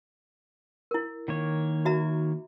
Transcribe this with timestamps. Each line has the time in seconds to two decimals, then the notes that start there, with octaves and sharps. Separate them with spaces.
0.91 E4 A#4
1.28 D#3 A#3 C#5
1.85 F#4 E5 A#5